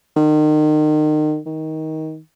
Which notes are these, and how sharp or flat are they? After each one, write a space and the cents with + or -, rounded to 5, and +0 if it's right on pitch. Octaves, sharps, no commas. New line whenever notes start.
D#3 -30
D#3 +20